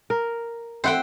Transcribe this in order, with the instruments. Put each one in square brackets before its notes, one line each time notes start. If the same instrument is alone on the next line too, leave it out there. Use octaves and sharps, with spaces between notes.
[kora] A#4
[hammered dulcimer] C4 E5 [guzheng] C5 F#5 G5